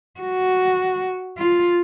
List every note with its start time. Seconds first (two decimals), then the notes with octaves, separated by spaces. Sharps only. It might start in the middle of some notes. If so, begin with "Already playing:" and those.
0.20 F#4
1.38 F4